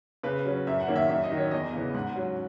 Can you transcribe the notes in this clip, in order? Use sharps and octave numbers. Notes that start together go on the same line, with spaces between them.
C#3 B4
F#3 C#4
F#2 E5
F#5
D#3 A#3 C#4
E5
F#2 E5
D#5
D#3 F#3
C#5
E2 D#5
C#3 E3 B3
G#2 F#5
F#3 C#4